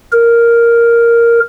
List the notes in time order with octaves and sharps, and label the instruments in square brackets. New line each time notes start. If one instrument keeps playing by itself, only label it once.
[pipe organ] A#4